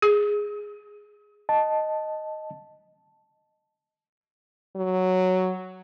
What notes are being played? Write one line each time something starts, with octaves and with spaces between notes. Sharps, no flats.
G#4
D#5 A5
F#3